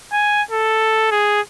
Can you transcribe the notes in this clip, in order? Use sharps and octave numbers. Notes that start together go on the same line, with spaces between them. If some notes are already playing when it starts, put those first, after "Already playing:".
G#5
A4
G#4